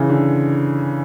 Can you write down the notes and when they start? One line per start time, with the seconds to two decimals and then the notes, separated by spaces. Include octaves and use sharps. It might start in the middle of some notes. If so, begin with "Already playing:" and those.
Already playing: C#3 E3
0.09 D3